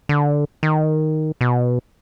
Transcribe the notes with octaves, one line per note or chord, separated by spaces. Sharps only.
D3
D#3
B2